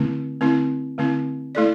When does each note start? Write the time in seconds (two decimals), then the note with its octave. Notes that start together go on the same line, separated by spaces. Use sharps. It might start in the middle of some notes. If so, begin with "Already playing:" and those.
Already playing: D3 A3 C4 E4
0.41 D3 A3 C4 E4
0.98 D3 A3 C4 E4
1.55 A3 E4 A4 D5